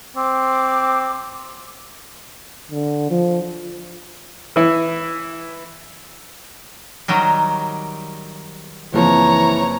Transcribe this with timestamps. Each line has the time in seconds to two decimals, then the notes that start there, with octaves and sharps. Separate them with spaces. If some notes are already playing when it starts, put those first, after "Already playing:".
0.17 C4 D6
2.71 D3
3.11 F3
4.56 E3 E4
7.08 D#3 F#3 G3
8.94 F#1 E3 F3 C4 C#5 A#5